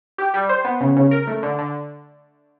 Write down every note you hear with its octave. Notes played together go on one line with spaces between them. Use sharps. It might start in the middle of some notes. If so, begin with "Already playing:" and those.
G4
G3
C5
B3
C#3
C#3
A#4
A3
D3
D3